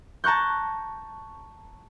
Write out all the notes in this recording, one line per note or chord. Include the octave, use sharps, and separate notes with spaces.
A5 A#5 C#6 F#6 G6